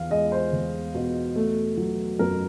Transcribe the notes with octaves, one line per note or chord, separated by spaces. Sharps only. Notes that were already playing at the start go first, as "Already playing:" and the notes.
Already playing: E2 F5
G#3 D#5
C5
E2
B2
A3
F#3
F#2 A#4